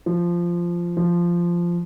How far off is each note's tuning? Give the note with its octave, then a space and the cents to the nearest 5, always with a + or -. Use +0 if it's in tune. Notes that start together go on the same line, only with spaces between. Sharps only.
F3 -10
F3 -10